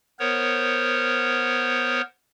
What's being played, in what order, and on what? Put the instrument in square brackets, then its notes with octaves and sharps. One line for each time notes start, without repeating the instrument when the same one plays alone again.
[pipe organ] B3 A#4 C5 C#5